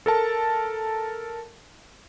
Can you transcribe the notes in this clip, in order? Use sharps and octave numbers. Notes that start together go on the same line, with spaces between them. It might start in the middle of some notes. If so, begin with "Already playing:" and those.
A4 A#4 A5